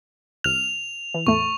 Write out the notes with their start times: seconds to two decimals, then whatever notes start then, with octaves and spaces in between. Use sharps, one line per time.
0.44 C2 F6 F7
1.14 E3
1.27 E2 A2 A3 C#6